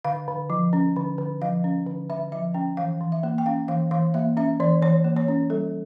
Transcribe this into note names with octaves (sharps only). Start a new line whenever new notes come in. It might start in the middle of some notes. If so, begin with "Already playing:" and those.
D3 F5
D3
F3
C#4
D3
D3
F3 F5
C#4
D3
D3 E5
F3 E5
C#4 G5
E3 F5
E3
E5
A#3
G5
C#4 F5
E3 F5
E3 F5
A#3 E5
C#4 E5
E3 D5
E3 C#5
A#3
C#5
C#4
G3 A4